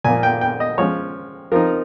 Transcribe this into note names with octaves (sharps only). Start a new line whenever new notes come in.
A#2 F3 A#3 G#5
G5
G5
D#5
F3 G#3 C#4 C#5
F3 C4 D#4 A#4